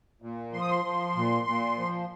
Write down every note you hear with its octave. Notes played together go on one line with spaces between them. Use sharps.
A#2
F3 C6
D#6
C6
F3
A#2
A#2
F3